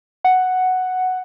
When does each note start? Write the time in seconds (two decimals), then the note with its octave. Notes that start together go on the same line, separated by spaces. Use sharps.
0.24 F#5